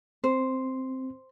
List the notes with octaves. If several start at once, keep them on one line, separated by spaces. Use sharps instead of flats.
C4 C5